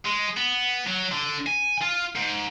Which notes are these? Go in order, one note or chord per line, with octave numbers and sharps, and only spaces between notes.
G#3
B3
F#3
D3
G#5
F4
G#2